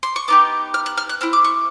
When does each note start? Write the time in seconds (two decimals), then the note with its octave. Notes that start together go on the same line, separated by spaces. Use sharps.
0.03 C6
0.16 C#6
0.28 B3 D#4 G4 D6
0.74 F6
0.86 F#6
0.97 F6
1.09 F#6
1.21 C4 E4 F6
1.33 D6
1.44 C#6